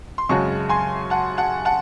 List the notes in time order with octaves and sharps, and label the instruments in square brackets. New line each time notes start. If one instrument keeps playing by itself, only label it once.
[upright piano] C6
[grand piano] F#2 C#3 G#3 C#4 F#4 [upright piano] A5 C#6
[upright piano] G#5 C6
F#5 A5
F#5 A5
F#5 A5